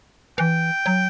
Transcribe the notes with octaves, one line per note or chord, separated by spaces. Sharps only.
E3 G5
F#3